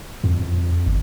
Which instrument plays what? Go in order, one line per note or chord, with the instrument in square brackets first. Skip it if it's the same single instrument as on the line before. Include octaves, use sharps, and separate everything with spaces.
[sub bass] F2
G1